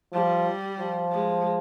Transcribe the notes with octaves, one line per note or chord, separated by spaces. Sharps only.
F3 G3
F3
G#3